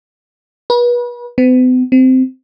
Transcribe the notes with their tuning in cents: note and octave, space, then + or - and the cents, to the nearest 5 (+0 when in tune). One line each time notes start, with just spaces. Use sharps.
B4 -35
B3 +45
C4 -15